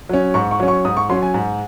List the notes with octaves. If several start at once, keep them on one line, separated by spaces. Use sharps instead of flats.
F#3 C#4
G#2 C#6
C#6
F#3 C#4
C#6
G#2 D#6
C#6
F#3 C#4 C6
G#5
G#2